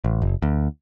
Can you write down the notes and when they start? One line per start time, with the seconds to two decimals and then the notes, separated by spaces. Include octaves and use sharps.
0.04 A1
0.22 F#1
0.42 D2